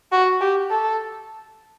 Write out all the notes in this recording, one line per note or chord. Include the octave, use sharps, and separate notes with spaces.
F#4
G4
A4